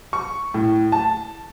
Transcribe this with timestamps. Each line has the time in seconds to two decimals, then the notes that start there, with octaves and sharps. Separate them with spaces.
0.13 C#6
0.54 A2
0.92 A5